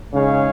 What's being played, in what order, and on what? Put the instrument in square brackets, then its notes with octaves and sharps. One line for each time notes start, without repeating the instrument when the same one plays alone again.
[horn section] C#3 [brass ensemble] G#3 D#4 G#4 C#5 F5